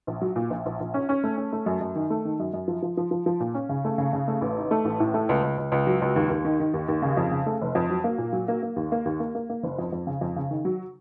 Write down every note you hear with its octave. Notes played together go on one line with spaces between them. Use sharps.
A#1
F#3
A#2
A#1
A#1
A#1
C#4
C#4
A3
C#4
A3
F#2
F#2
D#3
A3
D#3
F#2
F#2
F3
F3
F3
F3
F3
A#2
C#4
C#3
A3
C#3
C#3
A3
A1
D#4
A3
A1
A2
A3
C#2
C#2
C#2
C#2
F#3
C#2
D#2
D#2
D#3
D#3
D#2
D#2
C#3
F2
C#3
A3
F1
F2
F#3
A#3
A#2
F#3
A#3
A#3
D#2
A#3
D#2
A#3
A#3
A#3
F#1
F2
F2
C#3
F2
C#3
D#3
F#3